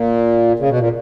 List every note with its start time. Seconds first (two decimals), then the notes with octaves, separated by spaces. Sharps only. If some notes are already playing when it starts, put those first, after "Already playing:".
Already playing: A#2
0.60 C#3
0.69 B2
0.79 A#2